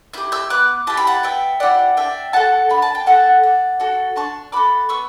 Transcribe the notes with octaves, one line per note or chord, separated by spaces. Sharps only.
E4 G4 G6
E6 G6
B3 D6 F#6
E4 G4 A5
B5
F#5 A5
B3 E5 G5
E4 G4 D5 F#5
D4 E5 G5
F#4 A4 F#5 A5
D4 B5
A5
G5
F#4 A4 F#5 A5
D4
F#4 A4
D4 A5 C#6
F#4 A4 B5 D6
B3 C#6 E6